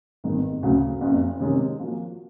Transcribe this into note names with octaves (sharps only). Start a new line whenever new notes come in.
G#1 G2 D#3 G#3 B3
D2 C#3 F#3
F#1 F2 C#3
C3 D#3 G#3 C#4
F3 A#3 F#4